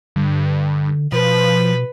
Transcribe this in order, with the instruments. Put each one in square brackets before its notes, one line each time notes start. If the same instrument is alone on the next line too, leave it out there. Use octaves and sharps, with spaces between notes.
[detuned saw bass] G2 [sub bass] D3
[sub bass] B2 [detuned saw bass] F3 [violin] B4